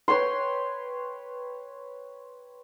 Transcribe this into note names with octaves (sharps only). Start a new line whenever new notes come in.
B4 C#5 G5 C6